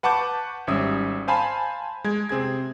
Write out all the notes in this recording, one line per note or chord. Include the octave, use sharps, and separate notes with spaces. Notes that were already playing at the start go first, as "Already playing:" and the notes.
B4 F#5 A5 C#6 D6 G6
G#1 G3 C#4 E5 D#6 E6
C5 F5 G#5 A5 B5
G#3 G#6
C3 C4 G#4 G#6